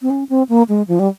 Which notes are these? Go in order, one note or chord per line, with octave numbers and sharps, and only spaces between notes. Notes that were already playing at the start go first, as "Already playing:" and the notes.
C4
C#4
C4
A#3
G#3
F3
G3